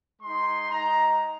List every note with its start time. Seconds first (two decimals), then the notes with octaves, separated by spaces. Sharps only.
0.22 G#3 D#4 C6
0.71 G#3 D#4 A#5